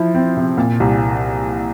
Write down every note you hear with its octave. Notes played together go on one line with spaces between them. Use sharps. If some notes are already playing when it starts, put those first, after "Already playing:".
Already playing: F3 E4
C4
C3
A#2
C2